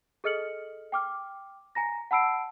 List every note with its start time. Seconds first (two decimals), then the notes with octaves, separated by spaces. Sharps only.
0.24 G#4 A4 D#5 F6 C#7 F#7
0.92 G5 D6 F6
1.75 G#5 A#5 A#6
2.11 F#5 A5 B5 E6 C7 D7